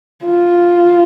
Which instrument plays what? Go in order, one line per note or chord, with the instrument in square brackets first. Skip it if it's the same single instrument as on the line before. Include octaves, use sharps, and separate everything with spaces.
[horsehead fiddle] F4